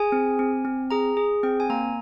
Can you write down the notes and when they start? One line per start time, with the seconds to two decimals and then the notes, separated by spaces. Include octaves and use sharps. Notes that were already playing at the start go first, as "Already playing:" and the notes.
Already playing: G#4 G#5
0.12 C4
0.39 C4
0.65 C4
0.91 G#4 A#5
1.17 G#4
1.43 C4 G5
1.60 G#5
1.70 A#3 A#5